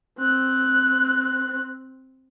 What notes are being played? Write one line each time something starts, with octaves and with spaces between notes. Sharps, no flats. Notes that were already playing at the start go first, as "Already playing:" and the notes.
C4 F#6